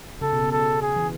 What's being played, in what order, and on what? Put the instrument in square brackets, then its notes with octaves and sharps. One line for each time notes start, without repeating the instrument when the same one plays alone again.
[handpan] C#3 [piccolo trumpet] A4
[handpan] B2
C#3
[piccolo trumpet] A4
G#4
[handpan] E3